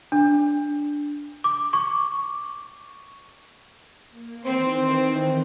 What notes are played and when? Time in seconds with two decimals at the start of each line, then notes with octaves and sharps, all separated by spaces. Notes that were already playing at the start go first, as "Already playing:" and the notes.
0.12 D4
1.44 D6
1.73 C#6
4.10 A#3
4.44 D#3 E3 C4